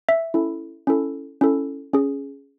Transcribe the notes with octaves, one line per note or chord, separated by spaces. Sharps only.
E5
C#4 E4 A4
C#4 E4 A4
C#4 E4 A4
C#4 G#4